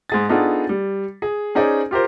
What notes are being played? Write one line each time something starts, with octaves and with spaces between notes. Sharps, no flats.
G#2 G#4 A6
B3 D4 D#4 F4 G#4 A4
G3
G#4
C#4 D#4 G#4 C5 D5
F4 G4 A#4 C5